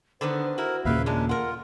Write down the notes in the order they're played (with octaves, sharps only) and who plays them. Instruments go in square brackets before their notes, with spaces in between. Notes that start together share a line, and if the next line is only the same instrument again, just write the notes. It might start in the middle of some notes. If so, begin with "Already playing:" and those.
[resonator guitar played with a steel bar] D3 D#3 B3 [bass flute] C5
[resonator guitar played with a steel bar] E4 F#4 [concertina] A#4
[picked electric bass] D#2 A#2 C#3 [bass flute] A#3 [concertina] B4 E5 F5
[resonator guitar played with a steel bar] F#2 G#3 [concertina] D4
[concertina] F4 [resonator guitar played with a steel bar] A#4 F#5